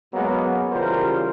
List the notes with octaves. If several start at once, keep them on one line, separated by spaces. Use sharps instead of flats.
F#2 F#3 G#3 A#3 B3
C#3 E3 G3 F4 A#4 C5